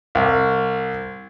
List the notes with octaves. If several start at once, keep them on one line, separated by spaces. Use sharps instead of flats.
C2